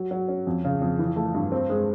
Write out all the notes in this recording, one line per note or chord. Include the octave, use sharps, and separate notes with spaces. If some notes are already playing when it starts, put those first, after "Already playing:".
Already playing: F#3
F#3
C#4
F2
C#3
F2
E3
A3
G2
C4
G#3